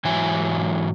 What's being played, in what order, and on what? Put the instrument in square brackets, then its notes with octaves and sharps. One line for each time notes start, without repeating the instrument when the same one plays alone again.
[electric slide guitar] G#2 E3 F#3 E5 G#5